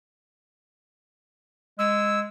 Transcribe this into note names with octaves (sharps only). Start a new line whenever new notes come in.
G#3 E6